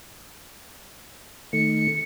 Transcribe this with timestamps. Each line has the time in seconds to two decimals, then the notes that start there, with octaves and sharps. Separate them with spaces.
1.53 D#3 A3 C#7